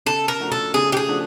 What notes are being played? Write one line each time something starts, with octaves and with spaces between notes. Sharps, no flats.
C#3 A4
A#4
F3 A3 D4 F#4
A4
C#3 G#4
G4
G#4
F3 A3 D4 F#4